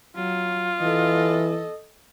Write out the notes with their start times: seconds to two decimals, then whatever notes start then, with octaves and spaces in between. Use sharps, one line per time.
0.16 F#3 F4
0.81 E3 A4 D#5